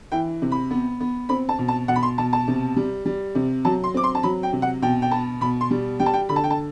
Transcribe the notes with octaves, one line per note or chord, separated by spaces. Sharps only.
E3 G5
C3
B5
B3
B3
C4 B5
A5
B2
A5
B2 F#5
B5
C6
B2 A5
A5
C3
G3
G3
C3
F#3 A5
C6
C4 D6
C6
A5
F#3 B5
G5
C3
F#5
B2 G5
G5
B3 A5
B2 B5
C6
G3
G3 G5
A5
G5
D3 B5
A5
G5
A5